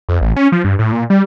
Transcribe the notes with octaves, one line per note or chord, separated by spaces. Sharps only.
F2
A1
C#4
F3
G2
A2
A#2
G3